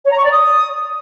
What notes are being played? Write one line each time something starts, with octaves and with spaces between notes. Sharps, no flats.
C#5
A#5
C#6
D5
D#6